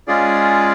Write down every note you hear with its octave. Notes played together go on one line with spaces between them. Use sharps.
G#3 C#4 F4 G#4 D5